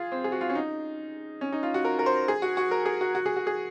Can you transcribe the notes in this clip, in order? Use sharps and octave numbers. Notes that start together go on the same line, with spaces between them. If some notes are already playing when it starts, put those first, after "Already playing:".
Already playing: F4 G#4
C4
G#4
F#4
F4
C#4
D#4
C#4
D#4
F4
F#4
A#4
A#4
C5
G#4
F#4
F#4
A#4
G#4
F#4
F#4
G#4
F#4
G#4